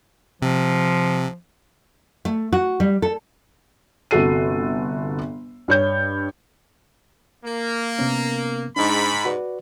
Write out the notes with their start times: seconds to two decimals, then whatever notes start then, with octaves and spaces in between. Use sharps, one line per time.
0.42 C3 F3
2.25 A3
2.53 F#4
2.80 G3
3.02 A4
4.11 G1 C3 F#4 A4 C7 D#7
5.68 G2 C#5 G6
7.45 A#3
7.99 C3 B3 C#4
8.76 G#2 D4 D#4 B5
9.25 F#4 B4 D5